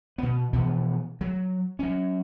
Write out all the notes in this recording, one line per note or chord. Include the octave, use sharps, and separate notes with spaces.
B2 B3
B2 E3 F3 B3
F#3
F#3 C#4